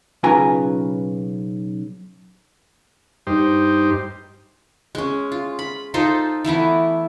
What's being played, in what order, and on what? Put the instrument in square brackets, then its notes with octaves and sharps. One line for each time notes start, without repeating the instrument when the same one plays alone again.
[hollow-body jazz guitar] B1 C#3 F4 B4 G#5 A#5
[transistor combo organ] G2 D#4 G4 C5
[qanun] G#3 C#4
F4
B5
D#4 F4 A4 C5
E3 A3 B3 E4